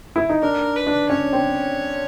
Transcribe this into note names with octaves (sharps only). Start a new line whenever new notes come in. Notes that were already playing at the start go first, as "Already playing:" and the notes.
E4
D#4
D4 A#4
B4
D4
C#4 C#5
C4